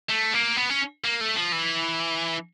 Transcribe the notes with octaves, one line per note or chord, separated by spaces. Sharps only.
A3
A#3
B3
C#4
A#3
A3
F3
E3